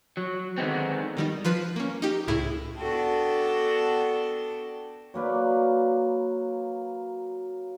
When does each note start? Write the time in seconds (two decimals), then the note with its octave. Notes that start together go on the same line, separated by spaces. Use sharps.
0.17 F#3
0.58 D3 D#3 G3 G#3 B3 C4
1.17 D#3 G3 D#4
1.45 F3 B4 C7
1.76 A#3 C#4
2.02 D#4 G4
2.27 C#2 A2 E4 G#4
2.77 B3 D4 F#4 A4 G5 A5
5.14 F#3 A#3 B4 D5